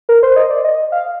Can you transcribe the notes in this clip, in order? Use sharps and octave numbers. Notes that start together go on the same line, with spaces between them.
A#4
C5
D#5
D5
D#5
F5